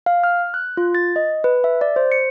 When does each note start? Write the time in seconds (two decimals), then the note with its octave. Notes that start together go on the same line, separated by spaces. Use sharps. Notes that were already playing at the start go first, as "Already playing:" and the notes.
0.06 F5
0.24 F6
0.54 F#6
0.77 F4
0.95 A6
1.16 D#5
1.44 B4
1.64 E5
1.81 D5
1.96 C5
2.12 C#7